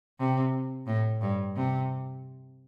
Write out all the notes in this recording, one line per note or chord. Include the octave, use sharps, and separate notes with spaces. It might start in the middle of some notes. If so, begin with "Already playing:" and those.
C3
A2
G2
C3